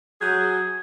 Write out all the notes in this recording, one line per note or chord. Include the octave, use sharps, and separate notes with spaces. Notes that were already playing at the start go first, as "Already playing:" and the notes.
F#3 G#4 G6 G#6